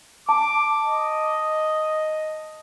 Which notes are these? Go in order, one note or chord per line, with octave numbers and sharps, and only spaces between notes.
A5 D6
D#5